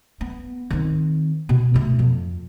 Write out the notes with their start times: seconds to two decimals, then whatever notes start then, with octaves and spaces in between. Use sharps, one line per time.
0.21 B3
0.70 D#3 C4
1.49 B2
1.74 B2 A3
1.99 F2